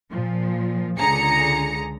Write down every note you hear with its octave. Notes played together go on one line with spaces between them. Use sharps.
A#2 F3
C#2 D3 G#4 A#5 C#7